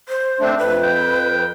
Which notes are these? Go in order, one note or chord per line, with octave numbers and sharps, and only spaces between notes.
C5
A3 C4 D4
F2 B4
G5